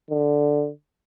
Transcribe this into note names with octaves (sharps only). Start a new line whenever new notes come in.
D3